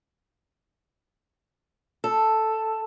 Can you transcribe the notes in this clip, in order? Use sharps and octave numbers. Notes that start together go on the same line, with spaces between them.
A4